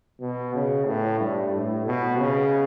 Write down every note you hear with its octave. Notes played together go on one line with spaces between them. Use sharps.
B2
C#3
A2
G2
A2
B2
C#3